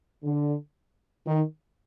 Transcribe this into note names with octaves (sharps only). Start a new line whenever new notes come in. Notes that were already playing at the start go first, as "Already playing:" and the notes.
D3
D#3